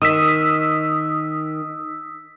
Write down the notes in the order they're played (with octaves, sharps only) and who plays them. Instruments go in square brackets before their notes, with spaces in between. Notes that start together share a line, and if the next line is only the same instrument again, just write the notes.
[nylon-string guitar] D#3 [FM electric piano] D#6 E6 B6